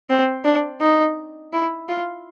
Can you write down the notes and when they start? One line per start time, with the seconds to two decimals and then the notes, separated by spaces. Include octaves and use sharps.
0.10 C4
0.45 D4
0.81 D#4
1.53 E4
1.89 F4